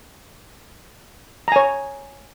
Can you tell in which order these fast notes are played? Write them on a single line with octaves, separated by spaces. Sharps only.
A#5 G#5 C#5